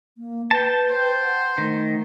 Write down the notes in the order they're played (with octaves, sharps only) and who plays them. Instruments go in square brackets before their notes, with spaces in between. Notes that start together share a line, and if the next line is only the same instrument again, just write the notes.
[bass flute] A#3
[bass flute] B4 [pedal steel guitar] G5 A5
[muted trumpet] C5
[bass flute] F#5
[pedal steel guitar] D#3 [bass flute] A3